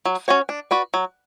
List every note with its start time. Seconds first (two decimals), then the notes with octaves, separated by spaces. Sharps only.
0.05 F#3
0.28 C#4 F#4 C#5
0.49 D4
0.71 F#4 B4 D5
0.94 F#3